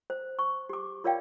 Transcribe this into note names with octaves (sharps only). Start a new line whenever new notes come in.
C5
C#6
G4 D6
F4 A#4 C#5 D5 F5 G5